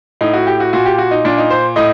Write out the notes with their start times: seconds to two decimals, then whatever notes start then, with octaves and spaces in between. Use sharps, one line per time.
0.21 A2 D#4
0.33 F#4
0.47 G4
0.60 F#4
0.73 A#2 F#4
0.86 G4
0.98 F#4
1.11 D#4
1.25 A#2 D4
1.38 D#4
1.50 C5
1.76 A2 D#5